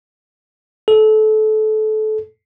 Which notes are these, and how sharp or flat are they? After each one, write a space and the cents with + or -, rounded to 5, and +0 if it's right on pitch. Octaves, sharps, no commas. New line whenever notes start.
A4 -25